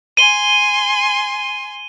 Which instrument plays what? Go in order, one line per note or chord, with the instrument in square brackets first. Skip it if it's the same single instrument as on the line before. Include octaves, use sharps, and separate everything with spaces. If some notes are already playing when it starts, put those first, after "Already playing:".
[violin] G#5 C6 [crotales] D#7 G7